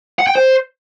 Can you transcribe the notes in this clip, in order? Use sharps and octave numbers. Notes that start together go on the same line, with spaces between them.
F#5
G5
C5